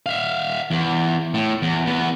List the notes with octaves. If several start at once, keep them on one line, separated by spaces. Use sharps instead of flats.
E5 F5
E2
A2
E2
E2 B3